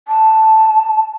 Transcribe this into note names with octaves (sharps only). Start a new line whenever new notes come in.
A5